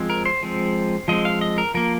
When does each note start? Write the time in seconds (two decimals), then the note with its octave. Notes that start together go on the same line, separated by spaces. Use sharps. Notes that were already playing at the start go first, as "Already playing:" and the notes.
Already playing: F3 G#3 C4
0.10 A#4
0.25 C5
0.43 F3 G#3 C4
1.08 F3 G#3 C4 D#5
1.25 F5
1.41 D#5
1.58 A#4
1.74 F3 A#3 A#4